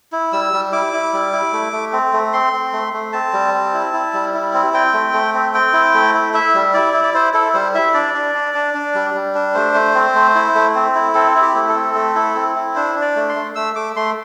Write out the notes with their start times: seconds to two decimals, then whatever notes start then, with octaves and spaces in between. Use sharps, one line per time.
0.12 E4
0.33 G3 E6
0.53 G3
0.72 E4 D6
0.93 E4
1.13 G3
1.33 E4
1.53 A3
1.72 A3
1.93 C4
2.13 A3
2.33 C4 C6
2.53 C4
2.73 A3
2.93 A3
3.13 C4 A5
3.33 G3
3.54 C4
3.74 E4
3.93 E4
4.13 G3
4.34 E4
4.54 C4
4.74 C4 G5
4.93 A3
5.13 A3
5.34 C4
5.54 C4 G5
5.73 E4
5.94 A3
6.14 E4
6.34 E4 E5
6.54 G3
6.74 E4 D5
6.94 E4
7.04 D5
7.14 E4 C5
7.34 E4 A4
7.54 G3 C5
7.75 E4 E5
7.94 D4 D5
8.14 D4
8.34 D4
8.54 D4
8.74 D4
8.95 G3
9.14 G3
9.35 D4
9.54 A3 C5
9.74 A3
9.95 C4
10.15 A3
10.35 E4
10.55 A3
10.75 C4
10.95 E4
11.15 C4 A4
11.35 E4
11.42 G4
11.55 A3
11.69 A4
11.75 C4
11.95 A3
12.15 E4
12.35 C4
12.55 E4
12.75 D4 C5
12.95 D4
13.02 D5
13.16 A3
13.29 C6
13.35 A3
13.55 A3 E6
13.76 A3 D6
13.96 A3 C6